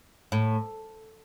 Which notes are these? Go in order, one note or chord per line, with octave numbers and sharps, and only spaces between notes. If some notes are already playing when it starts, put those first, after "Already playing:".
A2